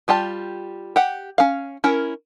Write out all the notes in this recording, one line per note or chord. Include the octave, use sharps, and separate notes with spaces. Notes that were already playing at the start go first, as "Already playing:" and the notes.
G3 F4 G4 A5
G4 F#5
C#4 F5
C#4 E4 A#4